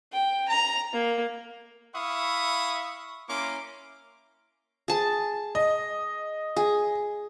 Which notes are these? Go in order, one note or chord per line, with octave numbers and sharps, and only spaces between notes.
G5
A#5
A#3
E4 E5 F5 B5 C#6 D#6
A#3 C#4 E4 A#4 C6 D6
G#4 A5
D#5
G#4